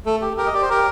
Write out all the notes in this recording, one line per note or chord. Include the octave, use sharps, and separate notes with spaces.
A3 A4
G4
G4 A#4
D#5
G4 D5
C5
G4 A#4